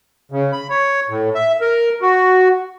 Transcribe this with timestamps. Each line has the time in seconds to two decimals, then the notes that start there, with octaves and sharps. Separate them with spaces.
0.32 C#3
0.52 B5
0.70 C#5
1.09 A2
1.35 E5
1.61 A#4
2.02 F#4